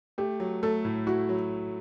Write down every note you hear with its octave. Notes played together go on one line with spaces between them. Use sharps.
A3 G4
F#3
A3 A4
A2
E4 F#4
F#3